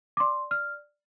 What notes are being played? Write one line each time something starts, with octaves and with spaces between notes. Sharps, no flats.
D6
D5 C6
D5 F6